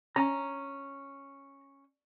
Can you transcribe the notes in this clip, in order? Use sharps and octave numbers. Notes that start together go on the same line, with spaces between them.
C#4 A#5